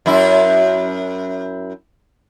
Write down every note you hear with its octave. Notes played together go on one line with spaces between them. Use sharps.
F#2 E4